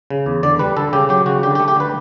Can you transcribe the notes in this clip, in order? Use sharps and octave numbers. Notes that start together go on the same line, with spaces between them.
C#3
E2
D3 D5
G3 B4
D3 A4
C#3 G4
F#3 G4
C#3 F#4
D3 G4
G4
A3
G4
D3 B4